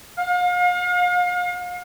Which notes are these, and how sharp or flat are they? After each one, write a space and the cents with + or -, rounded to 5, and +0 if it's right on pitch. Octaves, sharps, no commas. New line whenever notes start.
F5 +40